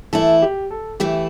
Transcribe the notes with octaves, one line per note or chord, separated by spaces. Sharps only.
E3 A3 E4 A4
G4
A4
E3 A3 E4 G4